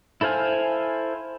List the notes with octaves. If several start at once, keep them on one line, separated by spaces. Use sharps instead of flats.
E4 A4 C5 F5 G#5